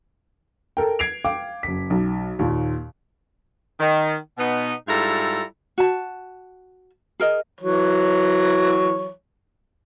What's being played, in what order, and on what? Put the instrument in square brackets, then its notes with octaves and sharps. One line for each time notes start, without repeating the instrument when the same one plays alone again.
[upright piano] A4 A#4 G5
G#6 C7 D7 F7
F5 G5 D6
F#1 B6
B1
D#2 A#2
[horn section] D#3
B2 B3 D#4
G#2 G3 E4 F4 A4 A#5
[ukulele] F#4 A5
G#4 A#4 D#5
[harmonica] E3 F#3 C#5